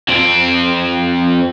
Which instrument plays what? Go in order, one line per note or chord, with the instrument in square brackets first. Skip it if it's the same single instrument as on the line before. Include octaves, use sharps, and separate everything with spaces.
[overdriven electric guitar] F2 C4